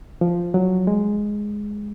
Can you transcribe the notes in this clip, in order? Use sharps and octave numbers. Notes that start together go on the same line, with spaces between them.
F3
F#3
G#3